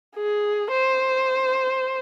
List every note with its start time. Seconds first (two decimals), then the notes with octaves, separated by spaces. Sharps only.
0.16 G#4
0.71 C5